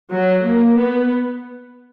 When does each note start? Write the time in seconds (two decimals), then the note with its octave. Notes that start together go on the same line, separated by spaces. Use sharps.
0.11 F#3
0.44 A#3
0.78 B3